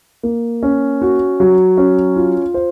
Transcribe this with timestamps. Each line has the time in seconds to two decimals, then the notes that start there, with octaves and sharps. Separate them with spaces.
0.23 A#3
0.63 C#4
1.02 F#4
1.40 F#3
1.77 C#4
2.16 F4
2.54 C5